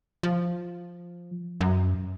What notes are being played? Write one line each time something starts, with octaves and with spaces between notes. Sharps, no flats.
F3
F#2